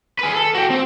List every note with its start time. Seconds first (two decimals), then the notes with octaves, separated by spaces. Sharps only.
0.19 G#4 B4
0.34 A4
0.55 F#4 G5
0.70 C4